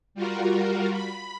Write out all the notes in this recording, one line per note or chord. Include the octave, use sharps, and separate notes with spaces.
G3 F4 F#4 A#4
B5